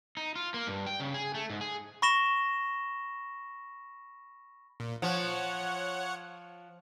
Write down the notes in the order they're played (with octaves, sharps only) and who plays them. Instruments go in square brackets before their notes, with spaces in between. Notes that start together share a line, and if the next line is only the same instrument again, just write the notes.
[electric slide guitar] D#4
F4
A#3
G2
G5
C#3
G#4
A3
G#2
G#4
[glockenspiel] B5 C#6 A#6 E7 G7
[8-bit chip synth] A#2
[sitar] F3 [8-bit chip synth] C#5 F#5